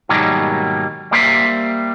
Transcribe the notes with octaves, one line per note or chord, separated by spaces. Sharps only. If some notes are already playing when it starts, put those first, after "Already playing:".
G#2 B2 D#3 F#3 G3 A#3
G3 A#3 C5 E5